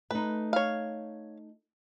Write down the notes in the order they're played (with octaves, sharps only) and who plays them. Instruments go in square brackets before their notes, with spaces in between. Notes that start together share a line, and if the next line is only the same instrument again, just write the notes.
[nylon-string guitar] A3 D#4 [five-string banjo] B4
[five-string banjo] C#5 F5